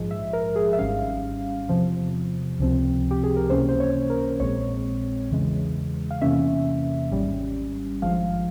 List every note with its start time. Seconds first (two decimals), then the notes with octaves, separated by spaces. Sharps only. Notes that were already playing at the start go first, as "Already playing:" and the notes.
Already playing: A#1 G#2 F3 G#3
0.11 E5
0.33 A#4
0.56 G#4
0.73 E5
0.78 G#1 G#2 G3 C#4 F5
1.69 E2 C3 F3
2.59 C#2 C3 F3 C4
3.11 G4
3.24 G#4
3.36 A#4
3.50 C#2 C3 E3 A#3 C#4 C5
3.69 C5
3.80 C#5
4.10 A#4
4.40 A#1 A#2 G#3 C4 C#5
5.31 E2 C#3 E3 G#3
6.11 F5
6.21 E2 C3 E3 A#3 C#4 E5
7.12 G#1 G#2 G3 C#4
8.02 G#1 G2 F3 G#3 F5